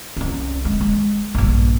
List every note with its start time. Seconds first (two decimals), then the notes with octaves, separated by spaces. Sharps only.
0.17 C2 C#4
0.65 G#3
0.81 G#3
1.35 A#1 G2